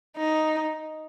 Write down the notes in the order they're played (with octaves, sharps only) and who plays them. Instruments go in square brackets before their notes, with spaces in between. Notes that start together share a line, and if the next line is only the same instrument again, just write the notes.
[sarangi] D#4